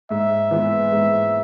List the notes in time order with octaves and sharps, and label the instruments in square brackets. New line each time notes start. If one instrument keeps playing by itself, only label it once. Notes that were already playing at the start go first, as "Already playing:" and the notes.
[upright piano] G#2 [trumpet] E5
[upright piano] E3 G#3 B3 E4
G#2